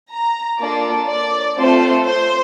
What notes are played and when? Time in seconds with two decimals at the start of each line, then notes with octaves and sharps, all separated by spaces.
0.11 A#5
0.59 A#3 D4 F4 A4 D5
1.08 D5
1.57 A3 C4 F4 A4 C5
2.05 C5